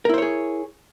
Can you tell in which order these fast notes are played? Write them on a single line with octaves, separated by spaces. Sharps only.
A#4 E4 C5 C#5 G#4